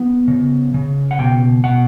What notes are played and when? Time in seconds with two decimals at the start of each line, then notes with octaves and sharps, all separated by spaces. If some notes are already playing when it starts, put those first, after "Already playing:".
Already playing: B3
0.28 C#3
0.74 C#3
1.11 F#5
1.19 B2 G5
1.64 B2 F#5